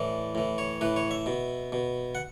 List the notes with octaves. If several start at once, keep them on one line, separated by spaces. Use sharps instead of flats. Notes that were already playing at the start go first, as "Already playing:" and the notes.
Already playing: A2 E3 D5
A2 E3
C#5
A2 E3 B4
C#5
E5
B2
B2
F#5